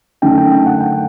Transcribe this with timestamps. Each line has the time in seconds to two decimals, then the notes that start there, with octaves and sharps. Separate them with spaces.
0.22 F#1 F#2 D3 A3 D#4 G5
0.38 G5
0.51 G5
0.66 F#5
0.80 G5